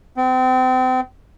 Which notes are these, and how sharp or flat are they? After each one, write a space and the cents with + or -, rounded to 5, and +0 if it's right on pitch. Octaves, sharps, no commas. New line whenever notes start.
C4 -35